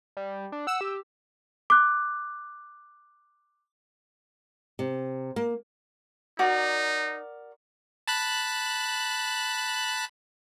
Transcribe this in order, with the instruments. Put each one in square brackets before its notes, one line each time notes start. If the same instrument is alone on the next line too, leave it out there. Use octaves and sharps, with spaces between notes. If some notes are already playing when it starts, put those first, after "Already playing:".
[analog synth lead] G3
D4
[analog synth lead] F#5 [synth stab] E6
[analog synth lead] G4
[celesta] D6 F#6
[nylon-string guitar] C3
A#3
[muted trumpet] D#4 [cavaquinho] F#4 A#4 D5
[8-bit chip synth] A5 B5 F#6